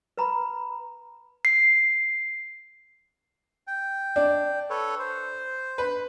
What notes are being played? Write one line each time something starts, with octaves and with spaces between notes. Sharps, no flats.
B4 A#5 B5
C7
G5
D4
A4 B4 C#5
C5
B4